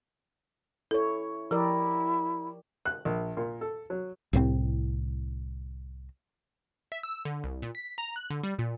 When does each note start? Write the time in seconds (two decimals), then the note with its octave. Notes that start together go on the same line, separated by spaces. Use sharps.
0.91 E4 A4 C#5
1.51 F3 E4 G4 A#4 D5 E6
2.85 F#6
3.05 A#1
3.37 A#2
3.61 A4
3.90 F#3
4.33 C2 A2 E3 C4
6.92 E5
7.03 E6
7.25 D3
7.44 C2
7.62 A#2
7.75 B6
7.98 A#5
8.16 F#6
8.30 D3
8.43 G3
8.59 A#2